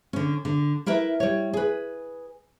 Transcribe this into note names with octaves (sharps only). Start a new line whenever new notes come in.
D3 C#4
D3
E4 A#4 B4 E5
G3 C#5
G#4 B4